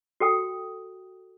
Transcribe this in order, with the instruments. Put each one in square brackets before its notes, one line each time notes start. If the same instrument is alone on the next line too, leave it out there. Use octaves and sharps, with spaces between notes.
[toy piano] F#4 A4 G5 D#6